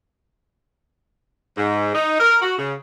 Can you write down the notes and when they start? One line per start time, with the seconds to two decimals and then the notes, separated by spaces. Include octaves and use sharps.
1.56 G#2
1.94 D#4
2.19 A#4
2.42 F#4
2.57 C#3